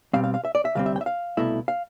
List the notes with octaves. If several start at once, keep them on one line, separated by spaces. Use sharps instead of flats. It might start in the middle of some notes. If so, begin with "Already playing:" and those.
B2 G3 C4 F5
F5
F5
E5
D5
E5
D2 C3 G3 C4 F5
E5
G5
E5
F5
C2 B2 A3 E4
F5